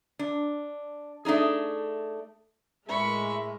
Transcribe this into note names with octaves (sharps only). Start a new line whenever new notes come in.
D4
A3 D4 D#4 G#4
A2 G#3 A#4 E5 B5 C#6